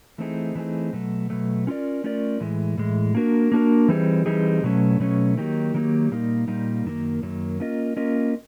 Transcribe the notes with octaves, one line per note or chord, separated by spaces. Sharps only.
E3 A3 C4 D#4 G#4
E3 A3 C4 D#4 G#4
B2 F#3 A3
B2 F#3 A3
A3 C#4 F4 A#4 D5
A3 C#4 F4 A#4 D5
A2 E3 G#3
A2 E3 G#3
A#3 D4 F#4 A#4
A#3 D4 F#4 A#4
E3 G3 C4 D#4 G#4
E3 G3 C4 D#4 G#4
B2 F#3 A3 C#4
B2 F#3 A3 C#4
D#3 F#3 A#3 D#4 G4
D#3 F#3 A#3 D#4 G4
A#2 G3 A#3 D#4
A#2 G3 A#3 D#4
F#2 D#3 F#3 A#3
F#2 D#3 F#3 A#3
A#3 C#4 F4 A#4 D#5
A#3 C#4 F4 A#4 D#5